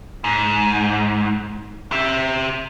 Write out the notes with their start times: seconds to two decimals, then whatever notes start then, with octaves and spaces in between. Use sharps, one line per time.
0.24 G#2
1.92 G4 E5